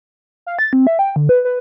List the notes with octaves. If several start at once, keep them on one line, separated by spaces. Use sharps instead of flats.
F5
A6
C4
E5
G5
D3
B4
B4